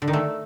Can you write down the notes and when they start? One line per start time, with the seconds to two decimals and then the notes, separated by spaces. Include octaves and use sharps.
0.02 D3
0.08 D#3
0.13 A3